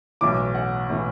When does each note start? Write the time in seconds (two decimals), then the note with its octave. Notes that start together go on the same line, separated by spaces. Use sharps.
0.21 B1 A2 E3 D6
0.55 F#5
0.90 A2 E3